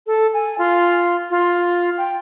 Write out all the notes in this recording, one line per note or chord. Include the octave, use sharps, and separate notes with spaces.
A4
G#5
F4
F4
G5